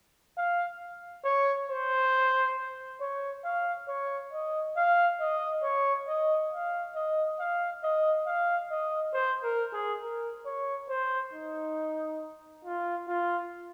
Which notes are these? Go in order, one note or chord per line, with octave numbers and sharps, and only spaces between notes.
F5
C#5
C5
C#5
F5
C#5
D#5
F5
D#5
C#5
D#5
F5
D#5
F5
D#5
F5
D#5
C5
A#4
G#4
A#4
C#5
C5
D#4
F4
F4